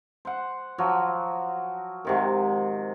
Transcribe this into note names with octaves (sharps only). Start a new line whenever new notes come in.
C5 F#5
F3 F#3
G#2 C3 D#3